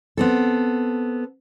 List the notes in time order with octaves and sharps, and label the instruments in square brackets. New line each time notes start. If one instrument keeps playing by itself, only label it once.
[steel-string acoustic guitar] B3 C4 A4